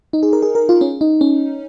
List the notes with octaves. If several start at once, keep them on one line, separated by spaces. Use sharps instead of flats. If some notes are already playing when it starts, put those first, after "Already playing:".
D#4
G#4
A#4
G#4
A#4
F4
C#4
D#4
C#4